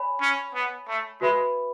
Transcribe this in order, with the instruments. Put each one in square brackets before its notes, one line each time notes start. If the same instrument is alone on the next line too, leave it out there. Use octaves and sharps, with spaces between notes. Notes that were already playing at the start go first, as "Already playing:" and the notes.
Already playing: [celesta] C#5 G#5 B5
[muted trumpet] C#4
B3
A3
[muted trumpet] G#3 [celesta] F#4 B4 E5 B5